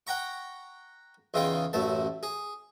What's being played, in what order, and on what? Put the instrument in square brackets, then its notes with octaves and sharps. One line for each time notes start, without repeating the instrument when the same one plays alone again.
[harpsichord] F#5 G5 A#5 C#6
E2 C#3 D#4 F4 G5
A1 F#2 A3 A5
G#4